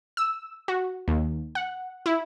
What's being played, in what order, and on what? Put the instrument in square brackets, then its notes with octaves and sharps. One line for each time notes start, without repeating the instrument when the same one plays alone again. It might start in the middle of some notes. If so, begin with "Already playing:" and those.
[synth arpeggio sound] E6
F#4
D#2
F#5
E4